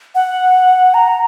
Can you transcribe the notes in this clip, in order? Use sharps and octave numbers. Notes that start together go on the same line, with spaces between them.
F#5
A#5